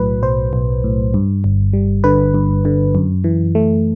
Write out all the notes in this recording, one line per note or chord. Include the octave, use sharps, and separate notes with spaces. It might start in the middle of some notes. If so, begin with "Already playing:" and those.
Already playing: B1 A2 F#3 B4
B1 C5
B1
A2
G2
G1
G3
D3 B4
G2
D3
F#2
E3
A3